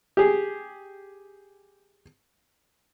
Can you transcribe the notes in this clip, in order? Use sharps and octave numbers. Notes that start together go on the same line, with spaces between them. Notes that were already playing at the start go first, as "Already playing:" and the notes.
G4 G#4